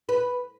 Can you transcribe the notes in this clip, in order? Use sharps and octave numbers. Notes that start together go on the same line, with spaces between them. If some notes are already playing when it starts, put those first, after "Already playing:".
B4